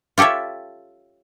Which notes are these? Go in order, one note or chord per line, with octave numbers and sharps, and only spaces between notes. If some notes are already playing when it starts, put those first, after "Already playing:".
F4 G4 A4 C#5 E5